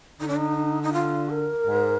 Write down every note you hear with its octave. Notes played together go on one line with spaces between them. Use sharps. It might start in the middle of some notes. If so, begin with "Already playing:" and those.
D3 D#4
D4
D#4
D#4
F4
A#4
G#2